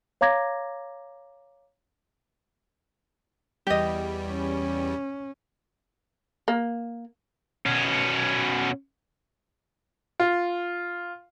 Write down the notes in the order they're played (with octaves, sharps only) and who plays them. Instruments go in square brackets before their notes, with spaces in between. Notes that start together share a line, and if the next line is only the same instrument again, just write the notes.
[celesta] C#5 F5 A#5 D6 G#6 A#6
[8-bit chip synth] E2 G3 [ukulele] G4 D#5
[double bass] C#4
[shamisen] A#3
[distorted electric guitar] B2 C#4
[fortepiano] F4